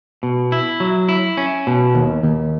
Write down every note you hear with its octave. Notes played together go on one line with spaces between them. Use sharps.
B2
E4
F#3
E4
C#4
B2
D#2
D#2